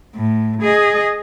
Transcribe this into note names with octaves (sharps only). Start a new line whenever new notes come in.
A2
G#4 D#5